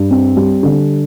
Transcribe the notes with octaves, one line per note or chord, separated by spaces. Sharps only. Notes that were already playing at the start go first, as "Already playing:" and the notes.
Already playing: G2
C4
G3
D3